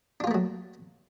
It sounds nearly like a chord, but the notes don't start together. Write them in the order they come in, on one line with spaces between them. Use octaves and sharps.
D4 F4 A#3 A3 F#3